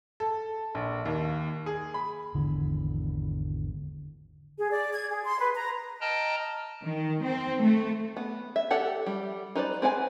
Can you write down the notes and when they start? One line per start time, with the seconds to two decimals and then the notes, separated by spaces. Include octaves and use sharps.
0.20 A4
0.75 A#1
1.05 D#2
1.66 G#4
1.94 B5
2.35 G#1 E2 D3 E3
4.58 G#4
4.71 D5
4.93 G#6
5.10 G#4
5.25 C6
5.40 B4
5.55 A#5
6.01 D#5 G5 A5 A#5 F6
6.83 D#3
7.22 C4
7.61 A3
8.17 B3
8.56 E5
8.71 G4 A4 D5 F#5
9.06 G3
9.55 D#4 B4 C5 D5
9.82 C4 B4 C5 G#5